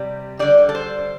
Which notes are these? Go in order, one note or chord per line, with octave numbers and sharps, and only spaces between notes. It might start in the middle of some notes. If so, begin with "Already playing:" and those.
Already playing: C3 G3
D3 G3 D5
A4
C5